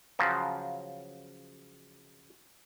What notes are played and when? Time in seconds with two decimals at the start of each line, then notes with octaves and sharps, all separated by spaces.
0.19 C#3 F3 F#3